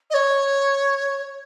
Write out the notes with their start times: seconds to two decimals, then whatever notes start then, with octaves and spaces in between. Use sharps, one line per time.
0.10 D#5
0.14 C#5